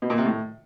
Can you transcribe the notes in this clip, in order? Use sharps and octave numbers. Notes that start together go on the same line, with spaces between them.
B2
A#2
C3
A2